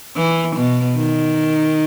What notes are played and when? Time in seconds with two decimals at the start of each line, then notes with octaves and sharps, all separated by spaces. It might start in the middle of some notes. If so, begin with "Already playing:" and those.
0.16 E3
0.56 B2
0.97 D#3